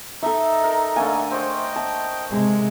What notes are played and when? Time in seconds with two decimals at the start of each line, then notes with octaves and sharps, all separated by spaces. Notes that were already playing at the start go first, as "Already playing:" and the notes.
0.23 D#4 A4 D#5 E5
0.64 A#4
0.96 D3 A3 A#3 G#5
1.31 C5 C#5 D#5 G5
1.76 A5
2.31 C3 G#3